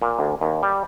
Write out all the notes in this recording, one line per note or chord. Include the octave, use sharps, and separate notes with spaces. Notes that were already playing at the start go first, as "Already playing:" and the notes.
A#2
D2
D#2
G3